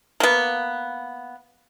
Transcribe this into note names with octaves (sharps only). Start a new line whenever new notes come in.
A#3 B3